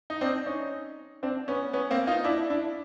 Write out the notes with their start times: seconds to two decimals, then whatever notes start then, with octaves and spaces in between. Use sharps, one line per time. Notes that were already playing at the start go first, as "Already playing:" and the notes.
0.10 D#4
0.21 C4 D4
0.46 C#4 D#4
1.23 C4 D4
1.48 B3 C#4
1.73 B3 C#4
1.91 A#3 C4
2.07 D#4 F4
2.24 D4 E4
2.50 D4 E4